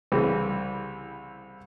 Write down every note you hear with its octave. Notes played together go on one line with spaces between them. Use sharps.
C2 C#3 E3 G3